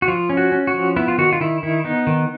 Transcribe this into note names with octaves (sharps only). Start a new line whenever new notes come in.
F#4
F3 F4
C#4
F#4
C#4
F#4
F3
B3 E4
F4
D#3 F#4
F4
D#3 E4
D#3 E4
B3 D#4
D#3